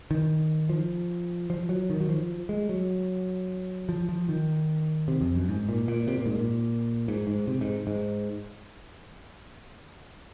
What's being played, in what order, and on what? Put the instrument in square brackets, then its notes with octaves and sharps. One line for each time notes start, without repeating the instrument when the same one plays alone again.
[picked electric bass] D#3
F3
F3
F#3
D#3
F#3
F3
G#3
F#3
F3
F3
D#3
C3
F2
F#2
G#2
A#2
A#2
C3
A#2
G#2
A#2
G#2
G#2
C3
G#2
G#2